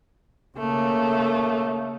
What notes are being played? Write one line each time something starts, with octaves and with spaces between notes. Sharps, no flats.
C#3 A3 A#3